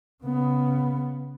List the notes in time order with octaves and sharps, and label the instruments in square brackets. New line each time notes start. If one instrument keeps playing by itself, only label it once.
[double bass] C#3 B3